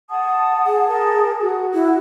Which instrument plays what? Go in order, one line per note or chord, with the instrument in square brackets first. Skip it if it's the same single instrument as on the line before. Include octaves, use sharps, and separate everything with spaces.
[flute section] F#5 A5 D#6
[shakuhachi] G#4
[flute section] A#4 A5
F#4
[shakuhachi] E4